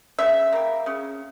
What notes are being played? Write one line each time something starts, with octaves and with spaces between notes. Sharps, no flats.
C#3 E5
G3 A#3
C#3